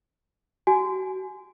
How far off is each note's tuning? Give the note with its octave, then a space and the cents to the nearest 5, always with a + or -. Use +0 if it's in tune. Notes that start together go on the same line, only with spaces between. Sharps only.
F#4 +30 G#5 +20